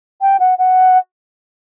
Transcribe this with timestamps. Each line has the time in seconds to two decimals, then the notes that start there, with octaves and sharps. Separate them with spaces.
0.21 G5
0.40 F#5
0.58 F#5